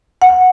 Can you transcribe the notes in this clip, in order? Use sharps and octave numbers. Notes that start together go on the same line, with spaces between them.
F#5